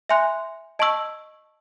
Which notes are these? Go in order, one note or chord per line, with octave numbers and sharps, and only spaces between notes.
E5 G#5 C6 F#6
D#5 A5 C#6 E6